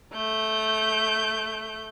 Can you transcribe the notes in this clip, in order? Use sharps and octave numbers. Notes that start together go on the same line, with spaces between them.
A3 G6